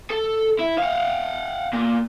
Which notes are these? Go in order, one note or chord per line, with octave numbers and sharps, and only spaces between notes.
A4
E4
F5 F#5
A#2